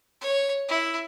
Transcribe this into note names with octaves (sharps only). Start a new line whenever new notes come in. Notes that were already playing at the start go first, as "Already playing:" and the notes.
C#5
E4